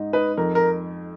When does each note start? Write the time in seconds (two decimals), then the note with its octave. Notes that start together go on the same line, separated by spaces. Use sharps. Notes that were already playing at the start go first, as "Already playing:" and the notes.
Already playing: G#2 D#4
0.13 D#4 B4
0.37 F2 A#4
0.55 A#4